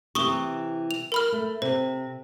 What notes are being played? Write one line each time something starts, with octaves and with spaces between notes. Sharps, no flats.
C3 E3 G4 C#6 D#6 G7
F7
A#4 B5 F6
A3
C3 C5